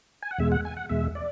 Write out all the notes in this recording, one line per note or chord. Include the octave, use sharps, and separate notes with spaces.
G#5
F#5
E2 B2 G#3 E5
F#5
G#5
F#5
E2 B2 G#3 E5
D5